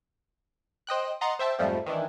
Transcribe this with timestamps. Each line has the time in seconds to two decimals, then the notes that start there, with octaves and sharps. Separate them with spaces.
0.87 C5 D#5 G5 F#6
1.21 D#5 F#5 A#5 C6 A6 C7
1.39 C5 E5 G5 A5
1.59 F2 G#2 F3 G3 A3
1.86 D#3 E3 D4 E4